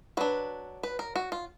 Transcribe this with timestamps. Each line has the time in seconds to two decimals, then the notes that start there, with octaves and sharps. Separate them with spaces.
0.17 F#3 D4 B4
0.83 B4
0.99 A#4
1.16 F#4
1.32 F4